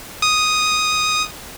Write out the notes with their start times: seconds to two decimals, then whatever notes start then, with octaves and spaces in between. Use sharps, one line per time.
0.22 D#6